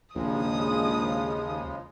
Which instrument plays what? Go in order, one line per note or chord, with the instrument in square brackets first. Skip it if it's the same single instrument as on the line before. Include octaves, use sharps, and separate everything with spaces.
[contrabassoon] A#1 [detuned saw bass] D#2 [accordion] C#3 F3 G#3 [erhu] D#6